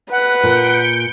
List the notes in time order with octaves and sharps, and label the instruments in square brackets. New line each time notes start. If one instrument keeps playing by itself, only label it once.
[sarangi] B4 [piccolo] F#5
[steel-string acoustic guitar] A#2 [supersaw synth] G6 C#7 D7